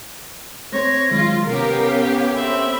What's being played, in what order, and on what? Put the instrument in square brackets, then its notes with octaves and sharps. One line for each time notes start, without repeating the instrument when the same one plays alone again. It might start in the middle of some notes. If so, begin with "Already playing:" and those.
[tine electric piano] A3 C4 C5 [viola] C#5 [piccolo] A#6
[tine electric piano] D#3 F#3 G#3 [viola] F4
[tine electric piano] C3 [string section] B3 C#4 G4 [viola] A#4 [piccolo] F5
[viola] C4 E5 [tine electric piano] A4 C#5 [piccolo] B5